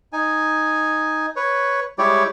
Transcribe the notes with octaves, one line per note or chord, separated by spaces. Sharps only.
D#4 G#5
B4 C#5
G3 G#3 E4 G4 C#5 D5